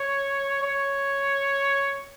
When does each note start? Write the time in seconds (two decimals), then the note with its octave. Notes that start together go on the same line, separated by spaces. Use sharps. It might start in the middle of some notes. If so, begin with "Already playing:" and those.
Already playing: C#5
0.62 C#5